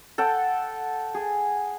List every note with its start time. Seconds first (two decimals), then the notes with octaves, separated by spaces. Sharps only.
0.18 A4 F#5 G5
1.14 G#4